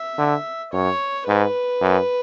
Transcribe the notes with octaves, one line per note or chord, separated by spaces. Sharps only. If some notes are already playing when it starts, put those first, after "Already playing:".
Already playing: E5
D3
F#2 C#5
G#2 B4
F#2